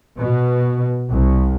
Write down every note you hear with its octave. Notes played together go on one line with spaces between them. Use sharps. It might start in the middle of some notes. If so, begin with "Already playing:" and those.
B2
C2